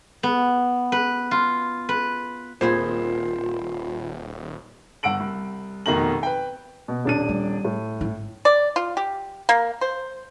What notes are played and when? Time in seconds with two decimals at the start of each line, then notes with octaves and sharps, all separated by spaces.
0.23 B3
0.92 B4
1.31 F4
1.89 B4
2.61 D#1 A#2 C4 F4 G#4 C5 B5
5.03 G1 F#5 E6 D7 F#7
5.20 C2
5.86 F1 B2 D#3 A#5 F#7
6.23 B4 G5
6.88 B2
7.05 D#1 D4 D#7
7.29 G3
7.65 A2
8.01 G#1 E4
8.45 D5
8.76 F4
8.97 G4
9.49 A#3
9.81 C5